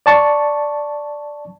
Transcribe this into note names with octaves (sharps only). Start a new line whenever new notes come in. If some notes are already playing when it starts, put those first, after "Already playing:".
D5 A5 C#6